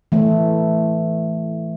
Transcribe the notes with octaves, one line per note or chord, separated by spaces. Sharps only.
E3 A3